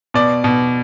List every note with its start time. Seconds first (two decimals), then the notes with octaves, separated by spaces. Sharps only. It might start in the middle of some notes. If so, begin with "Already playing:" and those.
0.14 B2 D5
0.44 B2